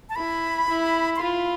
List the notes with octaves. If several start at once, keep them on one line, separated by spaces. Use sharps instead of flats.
A5
E4 B5
E4
C6
F4 B5